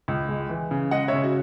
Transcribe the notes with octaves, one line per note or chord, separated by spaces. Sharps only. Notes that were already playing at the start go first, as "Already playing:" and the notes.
C#2
G#3
E3
C#3
G#3 D#5 F#5
C#3 C#5 E5
F#4